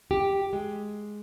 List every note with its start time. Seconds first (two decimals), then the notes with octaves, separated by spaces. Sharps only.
0.11 G4
0.53 G#3